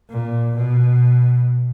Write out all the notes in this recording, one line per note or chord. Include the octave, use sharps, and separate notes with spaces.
A#2
B2